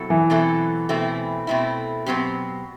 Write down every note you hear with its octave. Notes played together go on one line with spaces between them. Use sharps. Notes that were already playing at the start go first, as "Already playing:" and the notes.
Already playing: B2 F#3 C4 E4 A4
E3
B2 F#3 C4 E4 A4
B2 A3 C4 E4
B2 A3 C4 E4
B2 F#3 A3 C4 G4